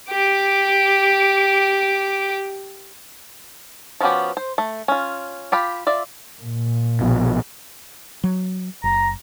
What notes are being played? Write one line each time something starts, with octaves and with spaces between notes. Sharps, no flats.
G4 D6
F3 B3 C#4 F#4 G4
C5
A3
C#4 F4
F4 G4 B5
F4 D5 E5
A#2
A#1 B2
F#3
F#1 A#5